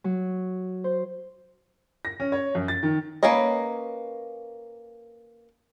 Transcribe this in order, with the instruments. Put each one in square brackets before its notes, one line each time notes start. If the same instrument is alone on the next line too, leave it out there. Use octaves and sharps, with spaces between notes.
[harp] F#3
C5
[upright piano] A#6
C#4
C#5
F#2
A6
D#3
[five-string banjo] A#3 C#4 B4 C#5 D#5